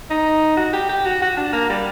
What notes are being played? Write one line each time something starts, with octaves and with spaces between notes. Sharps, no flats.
D#4
F#4
G4
G4
F#4
F#4
D4
A#3
G3